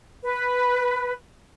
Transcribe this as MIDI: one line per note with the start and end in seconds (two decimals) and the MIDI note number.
0.24 1.11 71